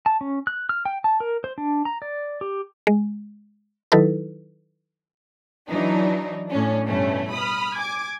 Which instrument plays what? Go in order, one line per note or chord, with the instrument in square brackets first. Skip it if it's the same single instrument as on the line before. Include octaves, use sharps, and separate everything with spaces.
[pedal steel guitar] A5
C#4
F#6
F6
G5
A5
A#4
C5
D4
A#5
D5
G4
[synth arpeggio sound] G#3
D#3 F#3 D#4 E4 A4 B4
[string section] E3 F#3 D4 D#4
A2 C#4 D4
G2 B2 E3 A3 C#4
B5 D#6 F6
G#5 D6 G#6